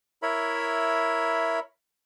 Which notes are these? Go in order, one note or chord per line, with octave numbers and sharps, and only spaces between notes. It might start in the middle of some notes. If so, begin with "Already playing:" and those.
E4 A#4 C#5 E5 B5